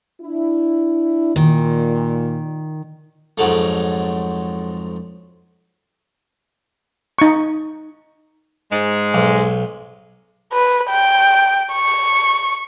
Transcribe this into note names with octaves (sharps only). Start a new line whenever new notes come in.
D4 E4
A#2 D#3
F2 G#2 F#3 A3
D#4 C#6
G#2 G#3
B1
B4
G5
C#6